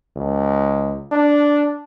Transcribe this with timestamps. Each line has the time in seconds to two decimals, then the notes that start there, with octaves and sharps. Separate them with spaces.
0.16 C#2
1.12 D4